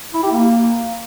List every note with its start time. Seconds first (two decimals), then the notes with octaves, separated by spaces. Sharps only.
0.14 E4
0.23 G4
0.32 A#3